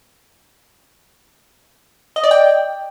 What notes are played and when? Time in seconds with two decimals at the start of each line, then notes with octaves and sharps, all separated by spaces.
2.16 D#5
2.24 D5
2.31 G5